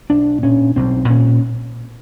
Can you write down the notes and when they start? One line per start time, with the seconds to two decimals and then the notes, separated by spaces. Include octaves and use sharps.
0.10 B1 D4
0.43 A#2 C#4
0.76 B1 C4
1.10 A#2 C#4